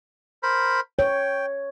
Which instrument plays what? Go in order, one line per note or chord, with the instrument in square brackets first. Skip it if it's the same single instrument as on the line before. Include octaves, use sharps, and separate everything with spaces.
[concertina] A#4 C5 B5
[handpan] C#5 [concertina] G5